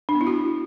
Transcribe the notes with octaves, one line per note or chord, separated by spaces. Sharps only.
D4
B3
E4
F#4